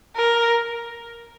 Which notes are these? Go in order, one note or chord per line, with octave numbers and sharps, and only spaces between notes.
A#4